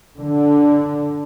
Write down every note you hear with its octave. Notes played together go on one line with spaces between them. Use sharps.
D3